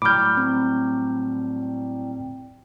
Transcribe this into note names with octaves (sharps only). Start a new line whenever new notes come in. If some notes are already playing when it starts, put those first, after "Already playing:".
A2 F#3 G3 B5 D6 F6 G6
C4